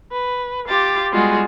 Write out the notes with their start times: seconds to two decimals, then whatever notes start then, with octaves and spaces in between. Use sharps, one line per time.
0.12 B4
0.67 F4 G4 D6 A6
1.12 G3 G#3 B3 F4 F#4 G#4